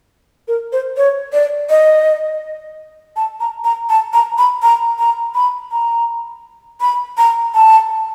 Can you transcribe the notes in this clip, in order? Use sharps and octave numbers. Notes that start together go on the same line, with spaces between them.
A#4
C5
C#5
D5
D#5
A5
A#5
A#5
A5
A#5
B5
A#5
A#5
B5
A#5
B5
A#5
A5